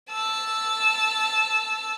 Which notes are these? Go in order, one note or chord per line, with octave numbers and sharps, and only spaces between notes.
A5 E6